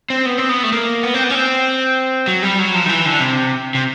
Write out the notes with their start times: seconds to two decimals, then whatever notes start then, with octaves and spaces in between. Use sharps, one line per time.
0.10 C4
0.26 B3
0.38 C4
0.49 B3
0.64 A3
0.72 A#3
1.03 B3
1.14 C4
1.24 B3
1.30 C#4
1.35 C4
2.28 F#3
2.43 G3
2.59 F#3
2.75 F3
2.86 D#3
2.89 E3
3.06 D3
3.20 C3
3.75 C3